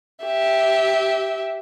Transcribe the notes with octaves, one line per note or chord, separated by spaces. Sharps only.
G4 E5